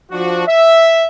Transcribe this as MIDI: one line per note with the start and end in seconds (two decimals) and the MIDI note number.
0.11 0.46 53
0.11 0.46 62
0.11 0.46 66
0.47 1.08 76